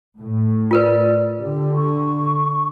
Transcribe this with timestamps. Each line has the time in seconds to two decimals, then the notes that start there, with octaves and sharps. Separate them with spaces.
0.20 A2
0.71 F4 A#4 B4 D5
1.40 D3 G4
1.76 C#6